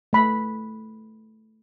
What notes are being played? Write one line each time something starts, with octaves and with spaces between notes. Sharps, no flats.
A3 B5